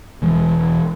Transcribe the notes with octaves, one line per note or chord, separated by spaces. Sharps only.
E1 E3 G#3